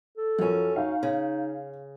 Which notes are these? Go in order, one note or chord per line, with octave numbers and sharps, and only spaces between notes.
A4
F#2 F3 C#4 A#4
D#4 F5
C#3